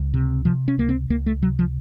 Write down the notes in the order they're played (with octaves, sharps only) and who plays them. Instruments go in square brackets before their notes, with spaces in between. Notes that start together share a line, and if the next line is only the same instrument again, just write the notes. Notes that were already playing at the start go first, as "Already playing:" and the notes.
Already playing: [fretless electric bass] C#2
C3
C3 F3
C#4
C#2 A#3
C4
C#2 A#3
A3
C3 F#3
F3